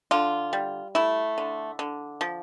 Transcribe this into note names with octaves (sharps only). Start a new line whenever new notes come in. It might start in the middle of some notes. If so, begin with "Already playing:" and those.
D3 F4
G3
A3 E4
D3
D3
F3